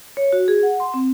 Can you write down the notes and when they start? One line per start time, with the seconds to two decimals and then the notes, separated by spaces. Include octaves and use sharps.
0.17 C#5
0.33 F#4
0.48 G#4
0.63 F#5
0.80 C6
0.94 C4